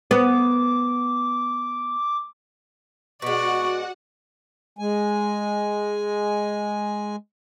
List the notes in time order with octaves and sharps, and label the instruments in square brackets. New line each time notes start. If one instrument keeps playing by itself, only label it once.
[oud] B3 [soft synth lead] D6
[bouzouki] B2 G#3 [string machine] F#4 F#5 [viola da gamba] D5 [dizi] C#6
[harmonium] G#3 G#5